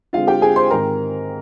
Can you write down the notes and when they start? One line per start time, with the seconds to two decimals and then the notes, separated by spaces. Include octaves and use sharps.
0.13 D3 G#3 C4 F4 F5
0.27 G4 G5
0.42 G#4 G#5
0.56 C5 C6
0.71 G#2 D#3 G#3 C4 A#4 A#5